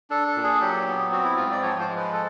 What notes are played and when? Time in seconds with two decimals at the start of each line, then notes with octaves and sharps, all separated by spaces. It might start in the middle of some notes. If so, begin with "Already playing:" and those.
0.10 D4 A4
0.28 A4
0.36 A#2
0.44 G#4
0.61 F#3 G4
0.87 B3
1.11 C4 F#4
1.24 E4
1.37 G#2 F4
1.52 D5
1.62 F3 C#5
1.80 C5
1.88 G#3
1.97 B4
2.13 A4